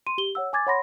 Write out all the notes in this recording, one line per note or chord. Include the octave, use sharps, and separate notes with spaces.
C6 D#7
G4 G7
C#5 F#5 E6
G#5 D6 G#6 A6
C#5 F#5 B5 C6 A#6